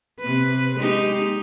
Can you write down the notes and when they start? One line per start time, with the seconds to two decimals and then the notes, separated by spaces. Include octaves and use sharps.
0.19 C3 B4
0.77 G#3 D#4 G4